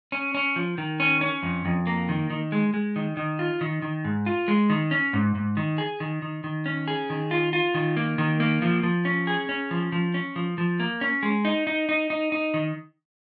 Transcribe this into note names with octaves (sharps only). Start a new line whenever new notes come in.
C#4
C#4
F3
D#3
C#4
C#4
F2
F2
A#3
D#3
D#3
G#3
G#3
D#3
D#3
F4
D#3
D#3
G#2
F4
G#3
D#3
C#4
G#2
G#2
D#3
G#4
D#3
D#3
D#3
C#4
G#4
D#3
F4
F4
D#3
A#3
D#3
A#3
F3
F3
C#4
G#4
C#4
F3
F3
C#4
F3
F3
A#3
C#4
G#3
D#4
D#4
D#4
D#4
D#4
D#3